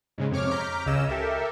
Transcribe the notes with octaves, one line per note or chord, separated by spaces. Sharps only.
G#2 C#3 G#3
F2 C3 C#5 D6 F6
A#5 D6 F6 G6 B6
C#2 C#3 C#4 D#5 E6 E7
G4 A4 A#4 E5